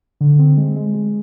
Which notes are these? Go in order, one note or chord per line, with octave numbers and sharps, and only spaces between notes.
D3
C4
G#3
G#3
G#3